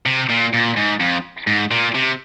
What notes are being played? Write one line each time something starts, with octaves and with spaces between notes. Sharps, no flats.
C3
A#2
A#2
G#2
F2
G#2
A#2
C3